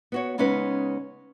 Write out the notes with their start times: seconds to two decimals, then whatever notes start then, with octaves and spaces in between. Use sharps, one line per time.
0.12 B3 F#4 C#5
0.38 C#3 G#3 B3 C#4 D#4 B4